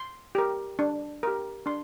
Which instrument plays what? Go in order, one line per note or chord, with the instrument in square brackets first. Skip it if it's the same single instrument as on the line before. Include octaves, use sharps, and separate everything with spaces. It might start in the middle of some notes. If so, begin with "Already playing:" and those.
Already playing: [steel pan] C6
G4 A#4
D4
G4 A#4
D4 C6